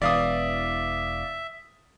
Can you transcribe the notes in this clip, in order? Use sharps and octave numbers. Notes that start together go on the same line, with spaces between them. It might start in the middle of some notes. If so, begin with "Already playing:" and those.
E1 E2 E3 D5 E5 F5 D#6